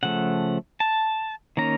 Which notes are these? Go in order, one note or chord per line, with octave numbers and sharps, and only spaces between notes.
C#3 F3 A3 F#5
A5
D#3 A#3 C#4 A#5